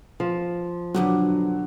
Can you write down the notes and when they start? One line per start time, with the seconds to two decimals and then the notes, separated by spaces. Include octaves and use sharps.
0.20 F3
0.94 G2 B2 D3 F#3